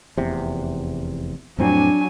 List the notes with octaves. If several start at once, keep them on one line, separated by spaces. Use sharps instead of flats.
F1 E2 C3
F2 A2 F#3 C4 D4 G#5